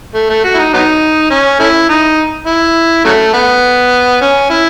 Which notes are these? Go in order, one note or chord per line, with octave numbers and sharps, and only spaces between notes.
A3
A3
F#4
E4
D#4
F#3 B3 D#4
C#4
A3 C#4 E4
D#4
E4
C#3 F#3 A3
B3
C#4
E4